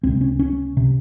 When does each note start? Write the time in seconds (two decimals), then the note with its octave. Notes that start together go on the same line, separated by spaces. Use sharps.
0.03 C#2 C3 C4
0.21 C#4
0.39 C#4
0.77 C3